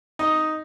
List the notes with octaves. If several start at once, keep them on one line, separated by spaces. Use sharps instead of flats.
D#4